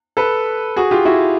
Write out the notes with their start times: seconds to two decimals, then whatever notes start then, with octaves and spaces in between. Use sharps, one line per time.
0.17 A4 B4
0.76 F#4 G#4
0.91 F4 G4
1.05 E4 F#4